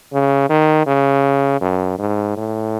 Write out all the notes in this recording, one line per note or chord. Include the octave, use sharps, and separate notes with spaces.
C#3
D#3
C#3
F#2
G#2
A2